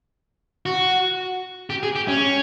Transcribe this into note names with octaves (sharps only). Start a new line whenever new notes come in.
F#4
G4
G#4
G4
C#4